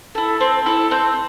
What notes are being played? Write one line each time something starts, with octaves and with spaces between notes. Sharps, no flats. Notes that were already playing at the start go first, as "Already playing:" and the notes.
E4 A4
C4
E4 A4
C4 G6